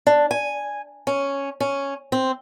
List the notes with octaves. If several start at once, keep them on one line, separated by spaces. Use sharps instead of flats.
D4
G#5
C#4
C#4
C4